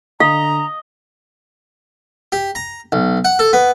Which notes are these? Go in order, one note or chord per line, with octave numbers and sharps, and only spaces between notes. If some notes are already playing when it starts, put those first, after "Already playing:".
D3 D#5 F5 A#5
G4
A#5
B1
F#5
A4
B3